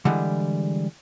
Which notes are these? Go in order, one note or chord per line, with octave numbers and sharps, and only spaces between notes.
D3 E3 G3 G#3